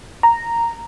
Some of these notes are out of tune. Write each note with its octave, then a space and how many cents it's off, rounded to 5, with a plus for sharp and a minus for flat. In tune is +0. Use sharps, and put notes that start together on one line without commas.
A#5 -5